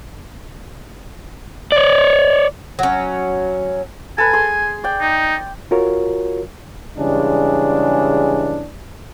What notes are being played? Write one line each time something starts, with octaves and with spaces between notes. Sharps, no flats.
C#5 D5
F#3 C#4
A4 B4 G#5
G#4 C6
D5 G5
D#4
F4 F#4 A#4 C#5
C#3 E3 G3 G#3 D4